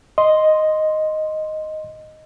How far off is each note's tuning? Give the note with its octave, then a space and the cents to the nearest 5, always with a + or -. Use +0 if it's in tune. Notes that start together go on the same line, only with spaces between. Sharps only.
D#5 +0 C6 +0